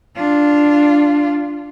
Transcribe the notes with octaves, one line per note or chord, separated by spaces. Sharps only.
D4 F4